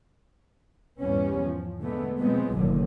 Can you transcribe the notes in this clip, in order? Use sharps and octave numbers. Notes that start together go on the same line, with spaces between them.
E2 G#2 G3 B3 C#4
F3
D3 G#3 A3 B3
B2 F3 F#3 G#3 B3 C4
F#1 B1 A2 D3 D#3 F#3